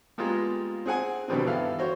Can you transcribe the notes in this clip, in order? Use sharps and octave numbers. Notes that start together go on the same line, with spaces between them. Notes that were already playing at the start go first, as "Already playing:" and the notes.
G3 G#3 A#3 B3 F4
C4 G#4 F#5 G#5
B2 D3 D#3 G3 B3 C4
G2 E3 B3 A4 F5
F#4 C5 C#5